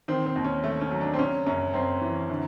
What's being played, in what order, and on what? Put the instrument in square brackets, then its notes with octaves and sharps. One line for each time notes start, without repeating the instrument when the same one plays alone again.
[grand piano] D#3 C4
C4
D#2
C#4
A3
C#4
F#3
D4
C4
C#3 C#4
F#2 C#4
F#2 C4
E3
D3